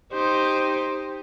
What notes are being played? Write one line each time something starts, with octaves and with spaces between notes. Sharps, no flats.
D#4 G4 C5